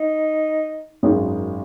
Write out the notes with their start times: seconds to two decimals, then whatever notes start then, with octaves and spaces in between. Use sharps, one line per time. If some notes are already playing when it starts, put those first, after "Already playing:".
Already playing: D#4
1.03 G#1 F#2 D#3 G#3